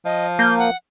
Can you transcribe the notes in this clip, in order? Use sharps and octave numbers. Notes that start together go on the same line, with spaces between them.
F3 D#5
A#3 G6
F#5